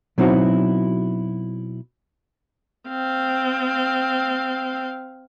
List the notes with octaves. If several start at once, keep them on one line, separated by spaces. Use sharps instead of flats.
B2 F#3 C4 D#4 E4 F#4
C4 F5